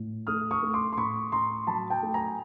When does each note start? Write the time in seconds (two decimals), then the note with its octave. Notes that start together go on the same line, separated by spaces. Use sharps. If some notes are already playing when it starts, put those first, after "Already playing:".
Already playing: A2
0.27 A3 D#6 F6
0.51 C#6 D#6
0.62 A3
0.74 C6 D6
0.92 C6
0.97 A2 B5 C#6
1.32 A2 A#5 C6
1.67 F#3 A5 B5
1.90 G5 A5
2.03 A3
2.14 G#5 A#5